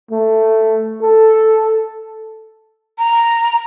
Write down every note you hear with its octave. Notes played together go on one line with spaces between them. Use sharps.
A3
A4
A#5